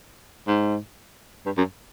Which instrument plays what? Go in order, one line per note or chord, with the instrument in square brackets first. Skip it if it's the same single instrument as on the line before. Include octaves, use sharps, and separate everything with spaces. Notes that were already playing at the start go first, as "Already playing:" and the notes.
[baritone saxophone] G#2
G2
F#2